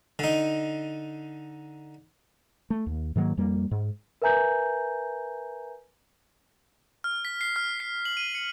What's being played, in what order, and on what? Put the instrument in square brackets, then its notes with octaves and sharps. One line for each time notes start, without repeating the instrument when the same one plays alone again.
[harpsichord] D3 D#4
[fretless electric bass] A3
D#2
G#2 D#3 F#3 A#3
F2 G3 A#3
G#2
[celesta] A#4 B4 E5 G#5 A#5 G6
[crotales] F6
B6
C7
F6
C7
F#7
D#7
C#7